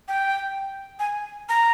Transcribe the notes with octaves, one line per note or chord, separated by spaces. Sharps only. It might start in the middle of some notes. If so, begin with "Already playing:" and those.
G5
G#5
A#5